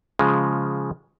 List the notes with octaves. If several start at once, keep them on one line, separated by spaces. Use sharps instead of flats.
C#3 F3 G#3